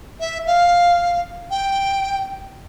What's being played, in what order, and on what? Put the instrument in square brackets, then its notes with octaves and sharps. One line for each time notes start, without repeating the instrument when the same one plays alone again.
[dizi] E5
F5
G5